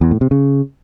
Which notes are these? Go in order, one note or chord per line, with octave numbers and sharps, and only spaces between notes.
E2
A2
C3
C#3